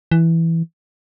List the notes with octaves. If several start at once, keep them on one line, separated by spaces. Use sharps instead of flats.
E3